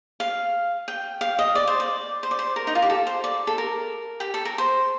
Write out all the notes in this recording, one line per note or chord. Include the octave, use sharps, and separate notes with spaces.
F5
G5
F5
D#5
D5
C5
D5
C5
D5
C5
A#4
D#4
F4
G4
A4
C5
D5
A4
A#4
G4
A4
A#4
C5